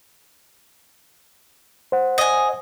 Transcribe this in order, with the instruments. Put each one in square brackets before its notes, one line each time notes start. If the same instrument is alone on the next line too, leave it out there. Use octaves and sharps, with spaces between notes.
[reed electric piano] C5 F#5
[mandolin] D#5 G#5